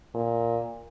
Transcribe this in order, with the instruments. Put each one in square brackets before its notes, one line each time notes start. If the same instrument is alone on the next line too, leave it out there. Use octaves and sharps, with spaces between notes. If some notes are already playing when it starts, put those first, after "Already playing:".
[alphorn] A#2